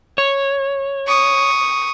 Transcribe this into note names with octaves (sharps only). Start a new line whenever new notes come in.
C#5
C#6 D#6